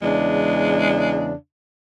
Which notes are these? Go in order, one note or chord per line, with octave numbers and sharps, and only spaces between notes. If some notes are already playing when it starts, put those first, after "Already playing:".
E2 C#3 G#3 D4